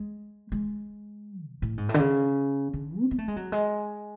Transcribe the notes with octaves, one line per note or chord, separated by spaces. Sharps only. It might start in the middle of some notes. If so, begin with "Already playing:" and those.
Already playing: G#3
G#3
B2
A2
G#2
A2
D3
C#3
D3
C#4
B3
A3
G#3
F#3
G#3